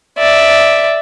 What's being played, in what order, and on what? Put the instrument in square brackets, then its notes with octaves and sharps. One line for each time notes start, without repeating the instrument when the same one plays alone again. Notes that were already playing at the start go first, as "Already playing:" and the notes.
[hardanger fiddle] D5 E5